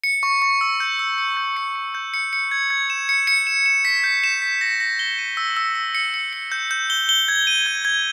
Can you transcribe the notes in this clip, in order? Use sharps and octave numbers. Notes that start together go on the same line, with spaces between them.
C#7
C#6
C#6
E6
G6
E6
C#7
G6
C#7
C#7
G6
C#7
C#7
G#6
G#6
E7
C#7
C#7
E7
E7
B6
G6
E7
B6
A#6
A#6
G7
D#7
E6
E6
E6
C#7
C#7
C#7
G6
G6
G7
G7
G#6
D#7
G#6
G#6